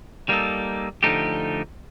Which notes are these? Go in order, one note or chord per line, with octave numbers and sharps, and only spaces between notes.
G3 A#3 D#4 A4
D3 F3 A3 D#4 G4